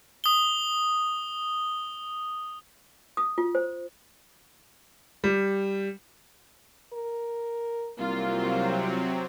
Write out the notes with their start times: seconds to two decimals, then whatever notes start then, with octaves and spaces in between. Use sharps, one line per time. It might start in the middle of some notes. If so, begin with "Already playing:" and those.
0.24 D#6 G7
3.17 D#6
3.38 F4
3.55 C5
5.24 G3
6.93 A#4
7.99 C2 C3 F#3 A#3 C4 F4